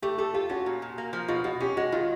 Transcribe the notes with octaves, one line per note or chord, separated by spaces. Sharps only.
A3 G4
G4 A4
F4 G4
C#4 F#4
A#2
A#2
A#3
F3
B2 F4
B2 F#4
C#4 G4
G#3 F#4
D#3 F4